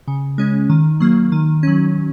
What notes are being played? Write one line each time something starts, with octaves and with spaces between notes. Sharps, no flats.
C#3
G#3 C#4
D#3
F#3 A#3
D#3
F#3 C#4